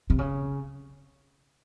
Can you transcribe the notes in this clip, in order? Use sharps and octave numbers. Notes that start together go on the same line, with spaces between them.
C3
C#3